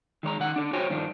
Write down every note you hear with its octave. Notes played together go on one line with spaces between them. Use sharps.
D#3 G#3 C#5 A#5
D#3 F#5
D3 D4
F#4 C5 C#5 G5 G#5
G2 D#3 F3 D4